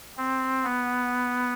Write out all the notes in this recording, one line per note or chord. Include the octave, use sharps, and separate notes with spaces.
C4
B3